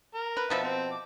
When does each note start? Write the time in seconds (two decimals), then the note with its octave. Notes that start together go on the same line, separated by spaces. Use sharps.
0.15 A#4
0.37 B4
0.50 B2 F3 A4 B4 E5
0.63 C4
0.92 D6